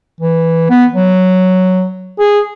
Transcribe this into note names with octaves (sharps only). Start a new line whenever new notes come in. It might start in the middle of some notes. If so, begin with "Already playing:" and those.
E3
B3
F#3
G#4